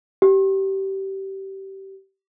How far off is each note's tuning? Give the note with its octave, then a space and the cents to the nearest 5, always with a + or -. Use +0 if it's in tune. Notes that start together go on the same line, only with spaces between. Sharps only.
G4 -25